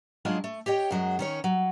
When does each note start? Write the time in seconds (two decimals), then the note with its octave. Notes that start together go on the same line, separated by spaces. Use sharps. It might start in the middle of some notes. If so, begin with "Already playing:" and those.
0.25 F#3 G#3 D4 D#4 F4 G#4
0.44 A3
0.66 G4 C#5 D#5 G5
0.91 F#2 F#3 G#3
1.19 D#3 C#4 C#5
1.44 F#3